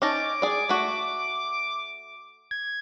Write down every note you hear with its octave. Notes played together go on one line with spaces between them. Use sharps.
C#4 D#4 A5 D6
G#4 D5
A3 F#4
G#6